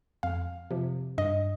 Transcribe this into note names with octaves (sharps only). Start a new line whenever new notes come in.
F2 F5
C3 F3
G2 D#5